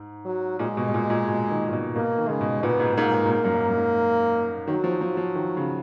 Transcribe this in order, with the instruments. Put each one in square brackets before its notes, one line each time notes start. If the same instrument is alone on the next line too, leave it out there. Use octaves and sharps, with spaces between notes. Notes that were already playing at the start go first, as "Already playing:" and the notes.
Already playing: [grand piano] G#2
[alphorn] F#3
[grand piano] A#2 [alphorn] G#3
[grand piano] B2
B2
A#2
A#2
B2
D#3
A#2
B2
[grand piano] B2 [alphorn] A#3
[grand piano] D#3
[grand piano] C#3 [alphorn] G#3
[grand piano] B2
[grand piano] A#2 [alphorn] B3
[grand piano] G#2
[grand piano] G#2 [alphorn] A#3
[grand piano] G#2
A#2
G#2
F#2
G#2
F#2
G#2
[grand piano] D#3 [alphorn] F#3
[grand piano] F3
F3
F3
D#3
C#3